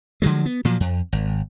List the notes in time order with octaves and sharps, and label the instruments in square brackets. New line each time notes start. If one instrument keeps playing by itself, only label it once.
[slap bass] D3 F3 F#3 G#3
B3
A#2 F3 F#3
F2
G#1